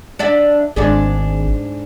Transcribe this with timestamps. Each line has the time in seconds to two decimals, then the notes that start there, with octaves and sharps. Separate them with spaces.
0.19 D4 D5 E5
0.76 G#1 G#2 D4 G#4